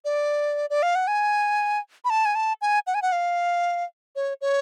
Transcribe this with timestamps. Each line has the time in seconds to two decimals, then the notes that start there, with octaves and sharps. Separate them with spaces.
0.05 D5
0.70 D5
0.83 F5
0.95 F#5
1.07 G#5
2.05 B5
2.10 A5
2.25 G#5
2.35 A5
2.61 G#5
2.87 F#5
2.95 G#5
3.02 F#5
3.12 F5
4.16 C#5
4.41 C#5